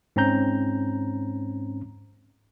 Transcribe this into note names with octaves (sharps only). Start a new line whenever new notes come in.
G#2 C4 C#4 A#5 G6